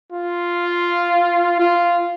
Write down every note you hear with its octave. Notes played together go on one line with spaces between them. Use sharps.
F4
F4